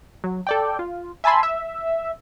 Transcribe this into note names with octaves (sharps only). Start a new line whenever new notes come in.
F#3
A4 D5 G5
F4
E5 G#5 A5 B5 C6
E5